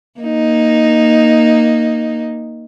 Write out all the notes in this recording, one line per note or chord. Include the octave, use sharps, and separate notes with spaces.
A#3 D#4